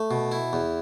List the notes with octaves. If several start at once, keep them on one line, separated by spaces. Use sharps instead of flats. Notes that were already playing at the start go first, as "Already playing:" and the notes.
Already playing: A3
B2
E4
E2